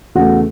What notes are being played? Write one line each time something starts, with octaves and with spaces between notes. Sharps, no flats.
E2 C#3 A3 F#4